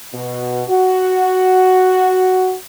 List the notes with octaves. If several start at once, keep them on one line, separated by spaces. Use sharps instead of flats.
B2
F#4